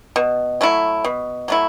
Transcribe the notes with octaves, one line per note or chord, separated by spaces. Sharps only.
B2
F#3 A3 E4
B2
F#3 A3 E4